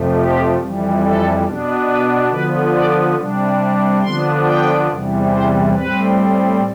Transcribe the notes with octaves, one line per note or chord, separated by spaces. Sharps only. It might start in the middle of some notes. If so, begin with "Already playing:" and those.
Already playing: F2 C3 F3 A3
G4
F2 E3 G3
A4
B2 B3 D4
B4
D3 F3 B3 B4
D5
C3 G3 D4
D3 F3 B3 D4 C6
G5
E2 C3 E3 G3
C5
A2 G3 C4 B4